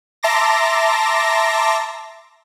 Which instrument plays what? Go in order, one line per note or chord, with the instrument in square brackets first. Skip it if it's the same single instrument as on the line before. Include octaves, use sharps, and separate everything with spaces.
[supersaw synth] E5 A5 A#5 C6 D6 A#6